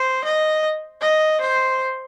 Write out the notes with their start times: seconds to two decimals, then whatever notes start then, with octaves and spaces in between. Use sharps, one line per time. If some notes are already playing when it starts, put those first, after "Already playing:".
Already playing: C5
0.25 D#5
1.01 D#5
1.41 C5